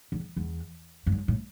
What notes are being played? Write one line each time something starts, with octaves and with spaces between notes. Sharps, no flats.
E2
E2
G2
F#2
A2